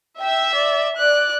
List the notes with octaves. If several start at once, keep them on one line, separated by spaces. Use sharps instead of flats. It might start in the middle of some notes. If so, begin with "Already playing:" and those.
E5 G5
D5
D5 F#6